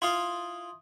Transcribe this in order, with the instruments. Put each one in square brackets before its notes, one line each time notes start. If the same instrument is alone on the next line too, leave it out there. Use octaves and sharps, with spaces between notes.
[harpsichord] E4 F4 F5 [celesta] C6 D#6